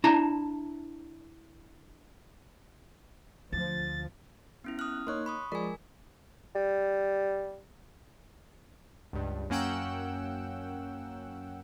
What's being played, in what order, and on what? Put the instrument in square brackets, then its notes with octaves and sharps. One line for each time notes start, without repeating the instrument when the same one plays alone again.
[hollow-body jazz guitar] D4 E4 A5 A#5
[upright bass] D2 [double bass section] F3 [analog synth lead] A6
[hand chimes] B3 C#4 E4
[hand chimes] D#6 F6 [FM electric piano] F#6
[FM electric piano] A#3 D#4 C#5 [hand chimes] C6 F#6
[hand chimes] B5 C#6 D#6
[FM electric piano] F3 G#3 D5 [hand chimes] A#4 G#5
[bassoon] G3
[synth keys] C#2 G2
F#2 A#3 C#4 F#5 G5 E6